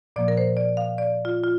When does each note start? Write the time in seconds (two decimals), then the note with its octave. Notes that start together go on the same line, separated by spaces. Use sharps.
0.16 A#2 F3 A#3 D5
0.28 A#4
0.37 C5
0.57 D5
0.77 F5
0.98 D5
1.25 F4
1.44 F4